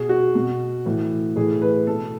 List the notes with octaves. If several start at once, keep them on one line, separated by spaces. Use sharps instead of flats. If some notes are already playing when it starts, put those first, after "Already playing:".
Already playing: B2 G#4
F#4
B2
A2 E3
A2 E3 G#4
B4
B2 A4